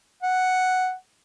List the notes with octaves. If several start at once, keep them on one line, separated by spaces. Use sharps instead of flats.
F#5